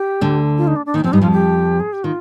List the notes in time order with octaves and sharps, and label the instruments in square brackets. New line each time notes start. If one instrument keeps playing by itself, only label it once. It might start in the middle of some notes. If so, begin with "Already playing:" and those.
Already playing: [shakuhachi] G4
[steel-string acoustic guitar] D2 D3
[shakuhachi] F4
D#4
D4
D4
[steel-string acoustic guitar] D#2 D#3 [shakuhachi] D#4
[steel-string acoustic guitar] F2 F3 [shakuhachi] C4
[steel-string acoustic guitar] G2 G3 [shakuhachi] D#4
[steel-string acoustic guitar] F2 F3 [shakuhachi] F4
[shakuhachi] G4
G#4
G4
[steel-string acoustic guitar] D#3 [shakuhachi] F4